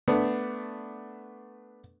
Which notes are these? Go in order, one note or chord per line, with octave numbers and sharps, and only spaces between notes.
A3 B3 D4